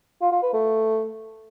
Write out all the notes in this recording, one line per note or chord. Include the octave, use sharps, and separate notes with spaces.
F4
F4
B4
A3